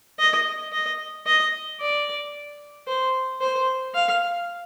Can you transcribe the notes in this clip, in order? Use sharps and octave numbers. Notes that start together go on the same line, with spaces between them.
D#5
D#5
D#5
D5
C5
C5
F5